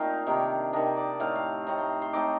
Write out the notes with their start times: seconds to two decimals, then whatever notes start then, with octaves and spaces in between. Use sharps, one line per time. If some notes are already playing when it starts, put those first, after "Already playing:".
Already playing: A#2 A3 C4 D#4 F5 G5
0.27 C3 D#3 A#3 D4
0.73 C3 D#3 A#3 D4 D#5
0.97 D5
1.20 A2 A3 C4 D#4 F5
1.35 F5
1.67 A2 A3 C4 D#4
1.78 C6
2.02 C6
2.13 A2 A3 C4 D#4 D6